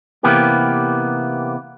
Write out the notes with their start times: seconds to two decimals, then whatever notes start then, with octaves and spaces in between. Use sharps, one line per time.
0.23 C3 E3 A#3 B3 G4